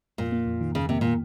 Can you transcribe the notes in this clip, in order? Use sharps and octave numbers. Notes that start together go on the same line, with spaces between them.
F2 A#2
A#3
F2
D#3
F2 C#3
C3 A#3
A#2